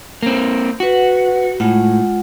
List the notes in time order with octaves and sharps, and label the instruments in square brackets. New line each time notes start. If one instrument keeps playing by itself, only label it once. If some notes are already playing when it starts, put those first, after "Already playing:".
[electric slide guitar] A#3 C4
[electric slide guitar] F#4 [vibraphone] B4 F#5
[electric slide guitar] A2 [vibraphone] G#3 F4 F#5